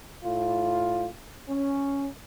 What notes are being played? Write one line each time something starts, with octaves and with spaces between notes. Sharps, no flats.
A2 F4
C#4